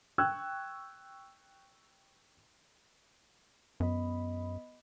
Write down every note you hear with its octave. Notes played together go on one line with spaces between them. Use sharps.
G5 C#6 E6 F#6 G#6
F#2 B3 D#5 B5